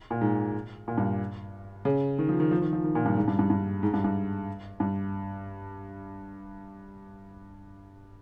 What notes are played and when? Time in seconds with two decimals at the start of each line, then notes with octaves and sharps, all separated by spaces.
0.10 A#2
0.21 G#2
0.88 A#2
0.98 G2
1.85 C#3
2.19 D#3
2.29 F3
2.40 D#3
2.51 F3
2.62 D#3
2.73 F3
2.84 D#3
2.95 A#2
3.06 G2
3.17 G#2
3.28 G2
3.39 G2
3.50 G2
3.83 G#2
3.94 G2
4.04 G2
4.80 G2